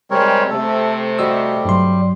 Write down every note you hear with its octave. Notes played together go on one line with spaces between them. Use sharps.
C3 G3 G#3 C4 A#4 C#5
C3 A3 A4
G3 F#4 D#5 E6
G2 F#3 C6